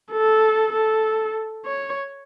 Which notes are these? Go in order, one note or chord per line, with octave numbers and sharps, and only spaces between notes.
A4
A4
C#5